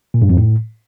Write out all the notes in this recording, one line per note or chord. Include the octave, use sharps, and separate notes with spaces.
A#2
G2
F2
A2